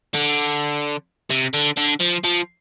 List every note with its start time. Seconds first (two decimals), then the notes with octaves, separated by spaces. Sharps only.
0.15 D3
1.30 C3
1.54 D3
1.77 D3
2.00 F3
2.24 F3